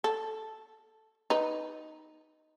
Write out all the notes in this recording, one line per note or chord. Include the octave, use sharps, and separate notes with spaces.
A4
D#4 B4